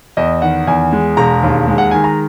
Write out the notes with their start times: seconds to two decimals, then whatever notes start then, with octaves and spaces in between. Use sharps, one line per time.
0.17 E2 D#5
0.42 D#3 F#5
0.67 E2 G#5
0.93 G#3
1.17 E1 A#5
1.43 D#2
1.68 G#3
1.78 F#5
1.91 D#3 G#5
2.04 A#5